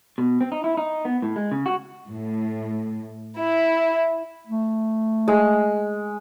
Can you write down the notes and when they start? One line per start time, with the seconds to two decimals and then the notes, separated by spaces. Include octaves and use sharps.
0.18 B2
0.41 C4
0.52 D#4
0.64 E4
0.77 D#4
1.05 B3
1.22 A2
1.36 G#3
1.52 C#3
1.66 F#4
2.09 A2
3.37 E4
4.47 A3
5.28 G#3